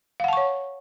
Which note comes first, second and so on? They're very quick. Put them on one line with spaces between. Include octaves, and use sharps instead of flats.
F5 F#5 A5 C#6 C#5